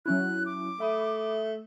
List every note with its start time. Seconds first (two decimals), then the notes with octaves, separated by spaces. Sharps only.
0.06 F#3 C#4 E4 F#6
0.46 D6
0.80 A3 E5 B5 D#6